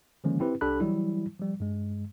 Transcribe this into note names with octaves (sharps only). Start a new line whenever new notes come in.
D3 D#3 F3 G#3 A#3 C#4
C4 E4 G4 B4
C2 D4 G4 A4 B5 F#6
E3 F#3 G3 E4
F3 G3
G2 G#3